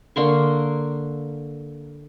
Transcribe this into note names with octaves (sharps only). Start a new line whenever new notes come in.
D3 A#3 C6 C#6